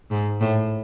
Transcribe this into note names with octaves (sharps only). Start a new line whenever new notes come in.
G#2
A2